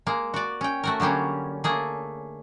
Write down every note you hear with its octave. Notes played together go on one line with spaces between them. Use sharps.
G#3 A#3
F#4 D5
C#4 G5
A3 F#4 A#4
D3 F#3 G3 A#3 C#4
A3 A#3 G#4